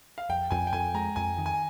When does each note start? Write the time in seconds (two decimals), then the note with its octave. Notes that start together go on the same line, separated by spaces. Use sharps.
0.18 F5
0.29 F2 G5
0.51 F2 G#5
0.67 G5
0.72 F2 G#5
0.94 G#3 A#5
1.16 F2 G#5
1.38 D#3
1.46 G#5